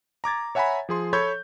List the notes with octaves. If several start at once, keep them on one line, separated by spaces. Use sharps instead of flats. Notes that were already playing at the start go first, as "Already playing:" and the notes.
A#5 D6 G#6 A6
C#5 E5 F#5 G#5 A#5 B5
F3 G#4 C6
A4 C#5 B5 C#6 G6 G#6